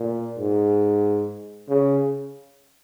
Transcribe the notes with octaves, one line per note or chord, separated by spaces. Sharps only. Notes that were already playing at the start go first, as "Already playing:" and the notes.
Already playing: A#2
G#2
C#3